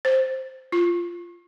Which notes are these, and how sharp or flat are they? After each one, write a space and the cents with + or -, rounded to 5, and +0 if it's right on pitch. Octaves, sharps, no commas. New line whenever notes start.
C5 +5
F4 -10